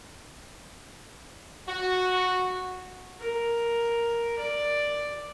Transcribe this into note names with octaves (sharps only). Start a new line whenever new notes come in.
F#4
A#4
D5